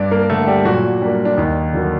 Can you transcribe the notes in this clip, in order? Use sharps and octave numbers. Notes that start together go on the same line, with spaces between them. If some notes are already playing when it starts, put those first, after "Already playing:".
Already playing: G2 D4 D5
A#3 A#4
D3 A3 A4
G3 G4
A#2 F#3 F#4
G3 A#3 D4
D4
D#2 D#4
D3 F#3 A#3